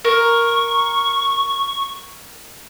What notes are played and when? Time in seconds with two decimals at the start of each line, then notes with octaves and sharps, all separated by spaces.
0.05 A#4 C#6